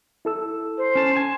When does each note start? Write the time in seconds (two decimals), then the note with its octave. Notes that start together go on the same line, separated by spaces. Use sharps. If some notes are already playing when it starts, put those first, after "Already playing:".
0.25 E4 A4 E6
0.78 C5
0.95 C#4 A5
1.16 G#5 A5